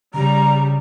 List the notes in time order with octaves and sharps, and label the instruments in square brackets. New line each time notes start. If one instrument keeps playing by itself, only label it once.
[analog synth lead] C#3 [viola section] G3 [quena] A#5